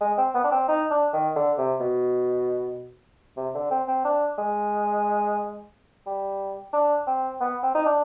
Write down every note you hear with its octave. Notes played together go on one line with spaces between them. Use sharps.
G#3
C4
B3
D4
C4
D#4
D4
D#3
D3
C3
B2
C3
D3
C4
C4
D4
G#3
G3
D4
C4
B3
C4
D#4
D4